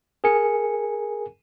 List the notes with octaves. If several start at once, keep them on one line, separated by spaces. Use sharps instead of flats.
G#4 A#4 G#5 C#7